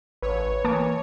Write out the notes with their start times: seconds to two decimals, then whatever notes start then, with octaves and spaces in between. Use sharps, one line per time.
0.22 A1 B4 C#5
0.64 E3 A#3 A5 D6